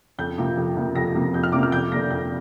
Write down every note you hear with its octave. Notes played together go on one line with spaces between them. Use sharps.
F2 G6
C3 F3 A#3
F2
C3 F3 A#3
F2 A#6
C3 F3 A#3
F2 G6
F6
C3 F3 A#3 D6
F6
F2 G6
D3 A#3 A#6
F2 G6